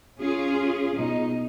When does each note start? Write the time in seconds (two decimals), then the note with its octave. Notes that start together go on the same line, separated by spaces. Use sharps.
0.19 C#4 F4 G#4
0.95 B2 D#4